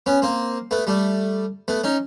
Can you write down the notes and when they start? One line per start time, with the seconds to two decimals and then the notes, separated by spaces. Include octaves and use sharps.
0.06 B3 C#4
0.22 A#3 C4
0.71 A3 B3
0.87 G3 A3
1.68 A3 B3
1.84 C#4 D#4